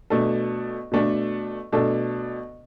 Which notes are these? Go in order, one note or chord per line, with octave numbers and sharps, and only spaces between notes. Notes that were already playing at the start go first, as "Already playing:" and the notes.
B2 A3 D4 A4
B2 A3 D4 A4
B2 A3 D4 A4